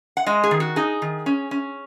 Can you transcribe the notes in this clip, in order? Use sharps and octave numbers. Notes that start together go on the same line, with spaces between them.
F#5
G#3 D#5
G#4
D#3
F#4
D#4 G#4
D#3
C#4
C#4